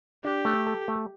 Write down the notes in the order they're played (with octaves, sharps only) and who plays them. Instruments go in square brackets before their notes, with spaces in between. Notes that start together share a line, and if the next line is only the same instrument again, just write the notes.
[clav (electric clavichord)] D4 [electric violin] G4
[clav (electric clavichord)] A3
A4
A3